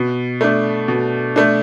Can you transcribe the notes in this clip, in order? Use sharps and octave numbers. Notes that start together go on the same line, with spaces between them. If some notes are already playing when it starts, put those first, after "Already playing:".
Already playing: B2
A3 D4
B2
A3 D4